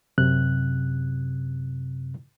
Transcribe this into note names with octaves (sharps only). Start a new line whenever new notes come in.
F#2 C3 F#6